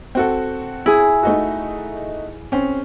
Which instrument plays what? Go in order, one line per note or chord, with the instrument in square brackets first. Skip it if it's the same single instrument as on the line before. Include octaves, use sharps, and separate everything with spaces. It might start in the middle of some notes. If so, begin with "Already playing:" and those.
[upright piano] C4 F#4 A4
[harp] E4 G#4
[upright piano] A3 D#4 F#4
C4 C#4